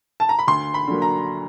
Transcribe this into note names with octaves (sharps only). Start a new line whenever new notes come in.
A5
A#5
B5
D2 C6
B5
D3 F#3 A#3
A#5